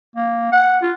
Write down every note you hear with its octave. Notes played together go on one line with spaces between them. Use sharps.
A#3
F#5
F4